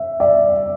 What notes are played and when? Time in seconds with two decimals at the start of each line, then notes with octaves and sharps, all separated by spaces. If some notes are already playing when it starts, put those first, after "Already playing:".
Already playing: E5
0.20 D5 E5